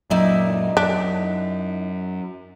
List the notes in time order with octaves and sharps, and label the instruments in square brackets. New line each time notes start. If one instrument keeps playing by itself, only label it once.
[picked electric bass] F#2 A#2 [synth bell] F#3 [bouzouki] D#4 E4 D5
[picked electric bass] F#2 [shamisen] D4 [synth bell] B6